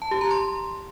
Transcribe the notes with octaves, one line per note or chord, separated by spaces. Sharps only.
A5
G4
A#5
C6